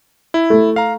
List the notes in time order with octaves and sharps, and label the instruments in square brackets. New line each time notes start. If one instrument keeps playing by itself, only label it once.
[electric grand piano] E4
[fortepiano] A3
[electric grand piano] F5 A#5